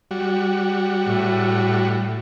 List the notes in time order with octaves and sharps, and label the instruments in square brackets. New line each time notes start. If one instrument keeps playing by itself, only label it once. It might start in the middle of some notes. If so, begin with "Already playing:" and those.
[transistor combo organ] G3 F#4
[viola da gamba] A2